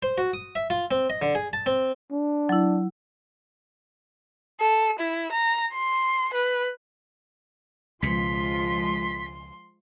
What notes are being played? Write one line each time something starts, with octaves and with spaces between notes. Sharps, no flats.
C5
F#4
D#6
E5
F4
C4
D#5
D3
G#4
A5
C4
D4
F#3 E4
A4
E4
A#5
C6
B4
C#2 B2 F3 G#3 F4 C6 B6